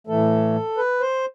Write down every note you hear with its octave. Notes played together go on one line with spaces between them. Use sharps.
A2 E3 A3 A4
B4
C5